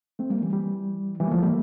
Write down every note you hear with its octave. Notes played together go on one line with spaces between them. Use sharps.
A3 C4
G3 A#3
E3 G3
E3 G3
E3 G3
A#3
F3 A3
G3 A#3